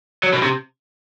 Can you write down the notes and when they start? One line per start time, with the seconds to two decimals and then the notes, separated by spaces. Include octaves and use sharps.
0.24 F#3
0.33 B2
0.43 C3